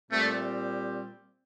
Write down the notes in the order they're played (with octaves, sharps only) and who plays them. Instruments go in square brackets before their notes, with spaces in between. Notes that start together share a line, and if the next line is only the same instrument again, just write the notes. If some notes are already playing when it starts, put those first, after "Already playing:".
[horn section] A#2 G3 C4 G4 [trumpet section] A3